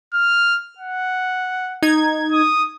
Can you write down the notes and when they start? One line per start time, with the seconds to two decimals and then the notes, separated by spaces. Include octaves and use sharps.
0.14 F6
0.79 F#5
1.82 D#4 G#6
2.32 D#6